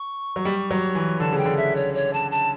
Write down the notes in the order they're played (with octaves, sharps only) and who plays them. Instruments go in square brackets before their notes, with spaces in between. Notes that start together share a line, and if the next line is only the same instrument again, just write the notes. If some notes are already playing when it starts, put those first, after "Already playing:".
Already playing: [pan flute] C#6
[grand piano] F#3
G3
F#3
E3
[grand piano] D3 [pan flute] A5
[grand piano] C#3
[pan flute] G5
[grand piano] D3
[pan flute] E5
C#5
C#5
A5
A5